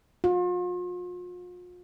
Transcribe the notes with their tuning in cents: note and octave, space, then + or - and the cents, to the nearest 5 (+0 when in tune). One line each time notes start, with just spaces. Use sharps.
F4 +40